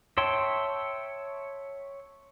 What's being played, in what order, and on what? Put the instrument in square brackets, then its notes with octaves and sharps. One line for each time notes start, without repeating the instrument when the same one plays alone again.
[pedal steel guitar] C#5 E5 G5 A5 C6